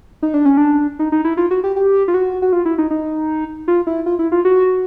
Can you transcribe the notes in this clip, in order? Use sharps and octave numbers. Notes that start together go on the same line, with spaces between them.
D#4
D4
C#4
D4
D#4
D#4
E4
F4
F#4
G4
G4
F4
F#4
F#4
F4
E4
D#4
D#4
F4
E4
F4
E4
F4
F#4